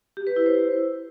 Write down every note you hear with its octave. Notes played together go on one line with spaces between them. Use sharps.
G4
B4
E4
C5